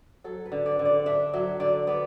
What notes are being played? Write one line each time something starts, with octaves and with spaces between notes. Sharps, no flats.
F#3 A4
B4
D3
D5
D3
D5
D4 E5
F#3 E5
D3 D5
B3 D5